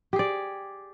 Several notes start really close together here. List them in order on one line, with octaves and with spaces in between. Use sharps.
G4 G#4 D5